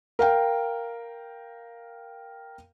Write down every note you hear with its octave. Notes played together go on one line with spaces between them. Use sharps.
A#4 F5 G5